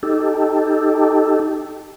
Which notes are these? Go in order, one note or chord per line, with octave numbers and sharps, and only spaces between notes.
D#4 G4 A4